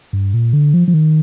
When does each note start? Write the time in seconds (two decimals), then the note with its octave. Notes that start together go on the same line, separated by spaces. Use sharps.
0.13 G2
0.34 A#2
0.53 D3
0.74 F3
0.88 F3
0.94 D#3